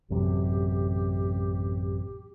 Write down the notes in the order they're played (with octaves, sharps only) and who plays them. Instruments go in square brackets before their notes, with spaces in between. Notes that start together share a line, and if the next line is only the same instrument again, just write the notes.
[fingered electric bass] A1 F#2 C3 [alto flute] G4